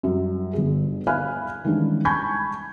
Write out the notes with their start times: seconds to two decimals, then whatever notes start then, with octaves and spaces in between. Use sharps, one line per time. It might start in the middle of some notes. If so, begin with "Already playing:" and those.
0.03 F#2 F#3 G3
0.53 G1 G3 G#4
1.07 E5 F5 G#5 B5 F6 F#6
1.65 D#3 E3 G3 G#3 C#4 D4
2.05 G#5 A5 B5 C#6 G6 G#6